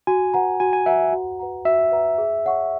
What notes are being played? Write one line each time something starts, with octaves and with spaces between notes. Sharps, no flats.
F#4 G#5
B4 F#5 A#5
F#4 G#5
G#5
B4 E5 F#5 A#5
F#4
B4 F#5 A#5
F#4 E5
B4 F#5 A#5
G#4
C#5 F#5 C#6